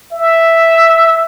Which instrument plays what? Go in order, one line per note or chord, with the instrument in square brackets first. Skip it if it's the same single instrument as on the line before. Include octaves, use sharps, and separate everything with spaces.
[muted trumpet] E5